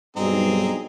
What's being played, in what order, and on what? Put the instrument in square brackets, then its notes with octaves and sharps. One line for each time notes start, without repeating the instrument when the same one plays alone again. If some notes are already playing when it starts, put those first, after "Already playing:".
[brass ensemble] B1 G2 [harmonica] C4 D#4 G#4